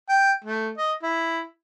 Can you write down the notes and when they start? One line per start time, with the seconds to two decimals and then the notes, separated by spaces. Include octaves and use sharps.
0.09 G5
0.44 A3
0.77 D#5
1.03 E4